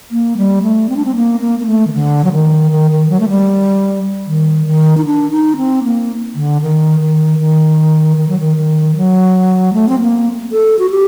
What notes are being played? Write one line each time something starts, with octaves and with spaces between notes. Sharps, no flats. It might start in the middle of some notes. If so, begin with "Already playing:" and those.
A#3
G3
A3
C4
D4
C4
A#3
A#3
A#3
A3
D#3
D3
F#3
D#3
D#3
D#3
F#3
A3
G3
D#3
D#3
D#4
D4
D#4
C4
A#3
D3
D#3
D#3
D#3
D#3
F#3
D#3
D#3
F#3
A3
C4
A#3
A4
F#4
G4